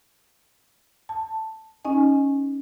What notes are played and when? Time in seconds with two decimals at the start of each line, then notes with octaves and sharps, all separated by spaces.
1.09 A5
1.85 C#4 D#4 D#5 G#5